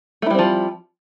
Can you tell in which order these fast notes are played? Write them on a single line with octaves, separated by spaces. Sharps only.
A3 E4 G3 C4 F3